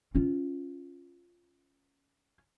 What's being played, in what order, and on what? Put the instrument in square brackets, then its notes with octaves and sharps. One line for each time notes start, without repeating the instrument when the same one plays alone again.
[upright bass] C#4 F4